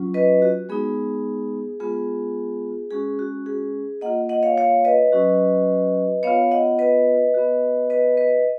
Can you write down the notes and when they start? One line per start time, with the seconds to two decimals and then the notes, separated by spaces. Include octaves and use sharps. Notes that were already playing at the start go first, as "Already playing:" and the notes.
Already playing: F#3 C#4 F4
0.14 B4 D#5
0.42 F#4
0.69 G#3 B3 D#4 G#4
1.80 G#3 B3 F4 G#4
2.91 G#3 C#4 F#4 G#4
3.19 F#4
3.46 G#4
4.01 A#3 F4 D#5 F#5
4.29 D#5 F#5
4.43 C#5 F5
4.58 C#5 F5
4.85 B4 D#5
5.12 F#3 C#4 F#4
6.23 B3 F4 C#5 F5
6.51 D#5 F#5
6.79 B4 D#5
7.34 B3 F#4
7.90 B4 D#5
8.17 B4 D#5